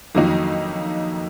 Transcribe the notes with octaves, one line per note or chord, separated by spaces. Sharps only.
F2 D#3 F#3 A#3 D#4